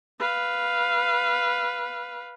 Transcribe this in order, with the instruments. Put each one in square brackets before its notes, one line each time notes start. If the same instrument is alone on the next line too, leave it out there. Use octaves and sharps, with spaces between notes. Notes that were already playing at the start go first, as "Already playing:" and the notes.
[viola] B4 F5